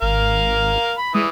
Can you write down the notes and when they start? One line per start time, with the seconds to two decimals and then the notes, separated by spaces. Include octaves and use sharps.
0.02 G#1 A#4 F5
0.98 B5
1.15 E3 G#3 D#6